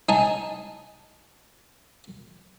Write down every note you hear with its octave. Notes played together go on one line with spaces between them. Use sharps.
D#4 G#5 A5